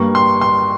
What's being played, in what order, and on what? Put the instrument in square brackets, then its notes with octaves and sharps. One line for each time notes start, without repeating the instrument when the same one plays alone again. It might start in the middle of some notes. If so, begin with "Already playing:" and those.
Already playing: [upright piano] G2 G3 A#3 C#6
C6
C6